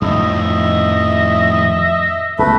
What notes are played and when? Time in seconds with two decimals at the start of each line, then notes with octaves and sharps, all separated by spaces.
0.02 F2 A2 D#3 F3 D#5 E5
2.39 C#2 C#3 A3 B3 B4